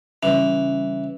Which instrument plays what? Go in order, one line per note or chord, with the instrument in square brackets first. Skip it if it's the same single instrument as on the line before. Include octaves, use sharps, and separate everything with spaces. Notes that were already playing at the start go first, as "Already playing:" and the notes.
[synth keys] C#3 G3 C#4 [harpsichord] E3